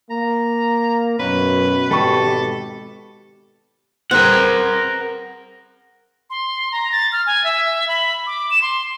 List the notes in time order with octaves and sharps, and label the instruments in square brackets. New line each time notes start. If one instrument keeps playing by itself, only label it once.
[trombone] A#3 [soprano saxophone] A#5
[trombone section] F#2 [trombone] B2 [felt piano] C#4 [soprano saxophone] B4
[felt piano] G#1 B5 C#6 [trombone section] G4 [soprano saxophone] A4
[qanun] C4 G#4 B4 [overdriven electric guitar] A#4 F#5
[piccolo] C6
A#5
A6
F6
G#5
E5
B5
D6
E7
C6